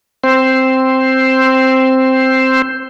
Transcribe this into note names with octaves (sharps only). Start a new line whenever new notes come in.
C4 C5